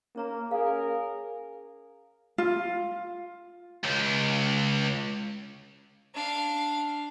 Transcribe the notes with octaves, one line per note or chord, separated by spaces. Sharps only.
A#3 C#4 C#5 A#5
C#4 G#4 A#4 F5
F4
C#2
D4 F5